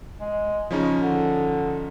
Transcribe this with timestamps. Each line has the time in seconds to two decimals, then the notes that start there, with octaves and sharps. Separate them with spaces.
0.20 G#3
0.71 C#3 F3 C#4 D#4
0.99 D3